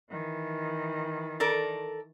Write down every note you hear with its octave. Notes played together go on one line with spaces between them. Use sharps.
D#3 E3
A4 A#4 D5